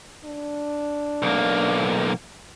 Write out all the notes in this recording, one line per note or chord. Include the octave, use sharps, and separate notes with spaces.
D4
B1 A#3